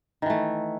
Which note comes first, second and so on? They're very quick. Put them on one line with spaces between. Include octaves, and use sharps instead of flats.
D#3 E3 A3